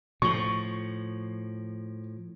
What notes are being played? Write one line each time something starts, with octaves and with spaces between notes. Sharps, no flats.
A2 F3 C#6